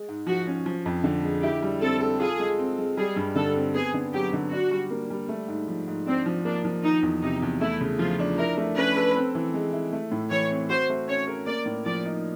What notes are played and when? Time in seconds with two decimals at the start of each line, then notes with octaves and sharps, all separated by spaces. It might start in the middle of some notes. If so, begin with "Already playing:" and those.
Already playing: G#3
0.08 G#2
0.27 F3 F#4
0.47 C#4
0.66 F3
0.86 F2
1.04 D3
1.23 G#3
1.43 E4 G4
1.62 G3
1.81 C4 A4
2.00 A4
2.20 F4 G#4
2.40 G#3
2.59 C4
2.79 G#3
2.97 G3 G#4
3.16 G2
3.36 D3 A4
3.55 C4
3.74 B3 G#4
3.94 D3
4.13 F#3 G4
4.33 D3
4.52 D4 F#4
4.71 G3
4.91 A#3
5.10 G3
5.29 A3
5.48 G#2
5.68 F3
5.87 G#2
6.07 C4 D4
6.26 F3
6.45 A#3 D4
6.65 F3
6.83 D#3 D#4
7.02 E2
7.22 C3 D#4
7.42 E2
7.61 A3 E4
7.80 C#3
7.99 F3 F4
8.19 D4
8.38 E4 A#4
8.57 A3
8.76 C#4 B4
8.97 A4
9.15 C4
9.35 E3
9.54 G#3
9.73 E4
9.93 A3
10.12 A2
10.31 E3 C#5
10.50 C4
10.70 F#4 C5
10.90 A3
11.08 C#4 C#5
11.27 A#4
11.47 A#3 D5
11.66 A2
11.86 F3 D5
12.05 D#4